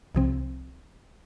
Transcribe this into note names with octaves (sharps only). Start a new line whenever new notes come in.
C2 C3 F3 C4